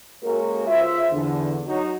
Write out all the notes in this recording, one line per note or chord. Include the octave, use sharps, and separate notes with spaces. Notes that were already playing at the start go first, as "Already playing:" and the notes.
G#3 A#3 C#4 F#4 A4 A#4
C#2 F4 C5 E5
E2 D3
F#3 D#4 F#4